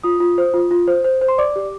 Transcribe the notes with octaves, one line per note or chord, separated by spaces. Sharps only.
F4 D#6
F4
C5
F4
F4
C5
C5
C5
C6
D5 D6
G4